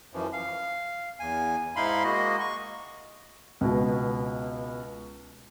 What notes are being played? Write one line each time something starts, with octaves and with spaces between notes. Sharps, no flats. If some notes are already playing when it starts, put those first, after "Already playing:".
F#2 E3 F3
F5
E2 G#5
G#2 D#4 E4 F5 B5 C6
G#3 A#3 F#4 D#5
C#6
C#2 B2